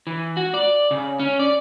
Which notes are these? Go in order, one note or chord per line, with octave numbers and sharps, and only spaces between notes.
E3
F#4
D5
C#3
C#4
D5